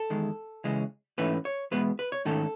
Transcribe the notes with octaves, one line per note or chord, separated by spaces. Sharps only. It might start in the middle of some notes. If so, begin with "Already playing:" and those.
Already playing: A4
E2 D#3 G#3
C#2 C#3 E3 G#3 C#4
G#2 E3 A3 C#4 B4
C#5
E2 B2 G#3 B3 B4
B4
C#5
G#2 D#3 A3 C#4 A4